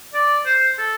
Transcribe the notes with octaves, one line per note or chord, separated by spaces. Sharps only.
D5
C5
A4